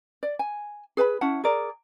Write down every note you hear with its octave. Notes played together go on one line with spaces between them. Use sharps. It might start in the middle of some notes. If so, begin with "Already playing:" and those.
D5
G#5
G#4 B4 A5 B5
C#4 E4 F#5 A5
G#4 A#4 D5